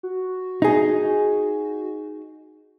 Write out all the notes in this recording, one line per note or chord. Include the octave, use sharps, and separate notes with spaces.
F#4
D#4 G#4